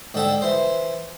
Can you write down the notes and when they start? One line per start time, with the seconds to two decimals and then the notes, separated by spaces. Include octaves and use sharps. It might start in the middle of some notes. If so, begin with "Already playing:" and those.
0.14 G#2 D3 A4 G5
0.42 E3 C5